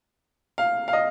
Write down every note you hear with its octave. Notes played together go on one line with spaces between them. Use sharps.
F5
F5
D#5